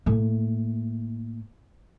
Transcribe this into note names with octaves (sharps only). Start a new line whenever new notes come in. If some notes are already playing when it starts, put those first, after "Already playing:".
A2 A#3